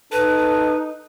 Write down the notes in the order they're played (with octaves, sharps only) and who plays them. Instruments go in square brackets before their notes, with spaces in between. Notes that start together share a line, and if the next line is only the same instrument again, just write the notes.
[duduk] D#4 [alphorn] A4 [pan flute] B4